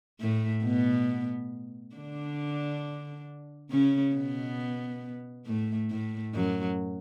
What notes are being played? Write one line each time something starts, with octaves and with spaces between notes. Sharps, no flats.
A2 A3
B2 B3
D3 D4
C#3 C#4
B2 B3
A2 A3
A2 A3
F#2 F#3